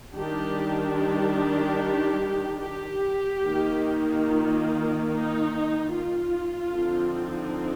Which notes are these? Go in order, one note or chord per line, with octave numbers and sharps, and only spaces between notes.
D#3 G3 D4 G4
G4
G4
D#3 A#3 D#4
F4
D#4
F4
D3 F3 C4 D#4